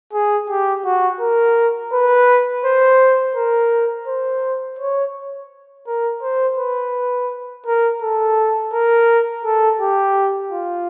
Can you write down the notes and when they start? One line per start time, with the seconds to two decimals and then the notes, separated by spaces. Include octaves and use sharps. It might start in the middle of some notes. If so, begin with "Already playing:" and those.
0.13 G#4
0.49 G4
0.85 F#4
1.20 A#4
1.93 B4
2.65 C5
3.35 A#4
4.08 C5
4.79 C#5
5.87 A#4
6.22 C5
6.58 B4
7.66 A#4
8.02 A4
8.73 A#4
9.45 A4
9.81 G4
10.52 F4